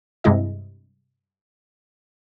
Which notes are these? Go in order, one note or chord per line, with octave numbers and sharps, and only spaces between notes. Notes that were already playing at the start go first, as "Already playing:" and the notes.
G2 C3 G#3 E4 D#5